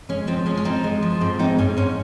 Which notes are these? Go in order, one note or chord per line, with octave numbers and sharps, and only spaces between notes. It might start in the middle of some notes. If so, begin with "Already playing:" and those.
G#3 C#4
F3 C4
G#3 C#4
C#4
F3 C4 D#4
G#3
F3
G#2 C4
G#3 C4 D#4
G#2 C#4
G#2 C#4